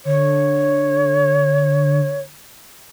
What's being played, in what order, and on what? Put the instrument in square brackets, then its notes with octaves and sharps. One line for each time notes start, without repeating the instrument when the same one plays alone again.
[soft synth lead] D3 [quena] C#5